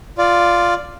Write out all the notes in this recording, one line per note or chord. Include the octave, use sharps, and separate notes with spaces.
F4 D5